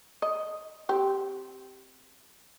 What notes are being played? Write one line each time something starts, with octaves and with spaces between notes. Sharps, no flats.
D#5
C4 G4